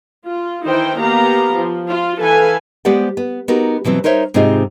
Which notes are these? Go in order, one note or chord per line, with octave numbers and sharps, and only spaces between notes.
F4
D#3 E3 D#4 E4 C5 G5
A#3 B3 G4 F5 A#5
F3
F4
E3 A4 B4 F5 G#5
G#3 B3 G4 C5 D5 F#5
B3
B3 D#4 F#4 G4 A#4
B2 E3 F#3 C4
D#4 A#4 C5 C#5 E5
G#2 C3 G#3 C4 D#4 F4